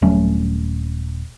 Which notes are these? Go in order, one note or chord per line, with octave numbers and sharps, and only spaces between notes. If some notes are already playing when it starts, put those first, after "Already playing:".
D#1 F#3 A3 C#4